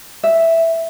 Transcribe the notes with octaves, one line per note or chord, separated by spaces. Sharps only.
E5